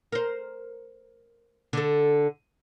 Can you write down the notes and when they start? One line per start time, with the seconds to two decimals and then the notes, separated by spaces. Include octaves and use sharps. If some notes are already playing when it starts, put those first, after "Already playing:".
0.12 A#4 C5
1.73 D3 A4